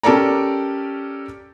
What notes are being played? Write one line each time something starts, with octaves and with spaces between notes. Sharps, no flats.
C#4 G4 A4 A#4 D5 A#5